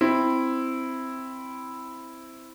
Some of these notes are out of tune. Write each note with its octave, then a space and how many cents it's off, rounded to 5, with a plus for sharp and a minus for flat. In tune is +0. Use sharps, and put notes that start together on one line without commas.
C4 +0 E4 +0